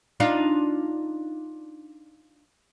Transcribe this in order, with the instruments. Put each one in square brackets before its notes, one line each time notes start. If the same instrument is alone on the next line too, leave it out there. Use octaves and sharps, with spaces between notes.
[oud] D4 D#4 F4